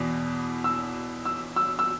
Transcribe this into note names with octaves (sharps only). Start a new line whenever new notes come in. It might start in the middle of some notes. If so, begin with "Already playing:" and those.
Already playing: E2 B2
E6
E6
E6
E6